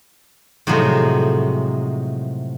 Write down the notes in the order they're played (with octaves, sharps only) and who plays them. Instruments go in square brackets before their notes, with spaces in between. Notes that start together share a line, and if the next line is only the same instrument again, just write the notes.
[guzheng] A2 C3 F3 F#3 G#3 D#4